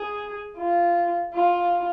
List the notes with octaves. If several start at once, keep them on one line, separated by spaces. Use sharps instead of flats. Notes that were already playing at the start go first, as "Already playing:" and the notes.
Already playing: G#4
F4
F4